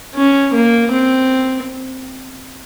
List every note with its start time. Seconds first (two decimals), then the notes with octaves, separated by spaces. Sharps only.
0.15 C#4
0.54 A#3
0.91 C4